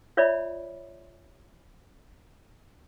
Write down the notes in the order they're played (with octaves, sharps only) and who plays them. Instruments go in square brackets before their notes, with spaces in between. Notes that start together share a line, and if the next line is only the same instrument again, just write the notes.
[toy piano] F4 C#5 D5 E5 B5